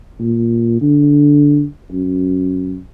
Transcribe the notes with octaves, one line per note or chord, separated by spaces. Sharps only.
A#2
D3
F#2